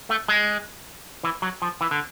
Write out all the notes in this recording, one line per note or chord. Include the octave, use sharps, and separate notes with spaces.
A3
G#3
E3
F#3
F3
E3
D3